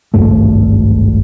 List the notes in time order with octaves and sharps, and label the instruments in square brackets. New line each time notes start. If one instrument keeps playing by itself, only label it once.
[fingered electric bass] G#1 C#2 G2 A3